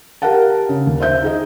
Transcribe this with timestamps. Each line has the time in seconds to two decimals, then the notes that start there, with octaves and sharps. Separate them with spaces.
0.22 G4 A#4 F5 F#5 A5
0.69 C#3
0.87 D#2
1.00 C5 E5 G6
1.22 D#4 G#4 D#5